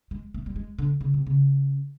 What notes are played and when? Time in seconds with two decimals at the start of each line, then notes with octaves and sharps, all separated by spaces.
0.11 G#3
0.34 A3
0.46 G3
0.56 G#3
0.78 D3
1.01 C#3
1.14 C3
1.27 C#3